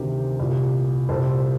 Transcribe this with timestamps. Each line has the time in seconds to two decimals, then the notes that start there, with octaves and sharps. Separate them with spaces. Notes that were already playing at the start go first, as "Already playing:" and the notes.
Already playing: D2 C3 D#3 G4 A#4
0.40 C2 A#2
1.09 C2 A#2 A4 C5